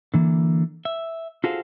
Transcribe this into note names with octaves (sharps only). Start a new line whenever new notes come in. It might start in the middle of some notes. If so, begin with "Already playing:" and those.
D3 E3 A#3
E5
F4 F#4 G#4 A4 C5 F5